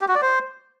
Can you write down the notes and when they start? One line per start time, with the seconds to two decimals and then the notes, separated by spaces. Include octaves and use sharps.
0.01 G4
0.08 F#4
0.15 D5
0.22 C5